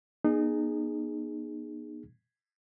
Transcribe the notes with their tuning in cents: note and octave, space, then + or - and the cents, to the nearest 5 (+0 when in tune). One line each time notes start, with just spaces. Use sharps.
B3 -40 D#4 -30 G#4 +0